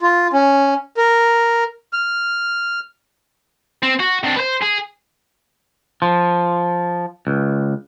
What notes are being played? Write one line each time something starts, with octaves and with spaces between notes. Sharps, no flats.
F4
C#4
A#4
F6
C4
F#4
C3 D4
B4 C5
G#4
F3
C#2